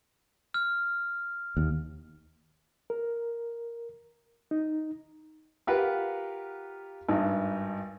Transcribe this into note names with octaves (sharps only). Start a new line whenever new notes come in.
F6
D#2
A#4
D#4
F4 G4 A#4 B4 F5 F#5
G#1 G2 D#4